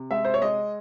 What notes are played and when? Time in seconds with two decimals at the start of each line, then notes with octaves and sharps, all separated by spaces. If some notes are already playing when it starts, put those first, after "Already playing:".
Already playing: C3
0.11 G#3 E5
0.25 C5
0.34 C#5
0.42 G#3 D#5